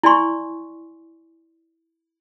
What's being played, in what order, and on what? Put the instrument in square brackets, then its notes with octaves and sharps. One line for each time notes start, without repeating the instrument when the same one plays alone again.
[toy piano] E4 D5 G#5 C6 C#6